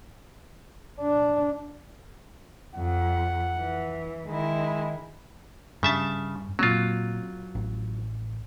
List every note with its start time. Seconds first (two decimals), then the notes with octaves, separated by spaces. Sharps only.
1.01 D4
2.76 F2 F#5
3.57 E3
4.27 D#3 G#3 E4
5.83 G2 C#3 E5 A5
6.59 A#2 F#3 A#3 C4 F4
7.55 A1